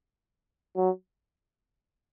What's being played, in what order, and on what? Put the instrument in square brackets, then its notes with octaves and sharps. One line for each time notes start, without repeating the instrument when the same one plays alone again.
[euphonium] F#3